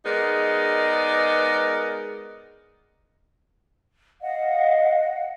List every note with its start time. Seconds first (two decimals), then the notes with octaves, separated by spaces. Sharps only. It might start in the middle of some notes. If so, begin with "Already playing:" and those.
0.04 G#3 B3 D#4 A#4 D5
4.21 D#5 F5 F#5